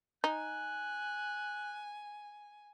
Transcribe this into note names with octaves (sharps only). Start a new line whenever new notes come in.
D#4 G#5 F#6